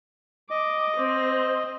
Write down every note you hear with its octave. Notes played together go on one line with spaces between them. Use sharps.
D#5 D6
C4